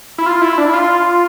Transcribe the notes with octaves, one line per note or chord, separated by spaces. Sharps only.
E4
F4
E4
D4
E4
F4